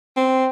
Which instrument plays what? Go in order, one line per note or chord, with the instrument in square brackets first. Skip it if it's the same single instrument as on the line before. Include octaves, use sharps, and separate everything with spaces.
[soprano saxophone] C4